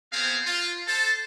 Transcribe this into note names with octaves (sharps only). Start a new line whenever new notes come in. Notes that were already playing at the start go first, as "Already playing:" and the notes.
B3 C4 G#4 C5 F5
F4
A4 C5 A5